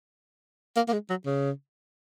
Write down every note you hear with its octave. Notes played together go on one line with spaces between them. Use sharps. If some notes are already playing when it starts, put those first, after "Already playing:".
A#3
A#3
G#3
F#3
C#3